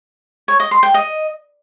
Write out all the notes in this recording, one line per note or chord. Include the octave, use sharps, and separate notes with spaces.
C#5
D#5
C6
G5
D#5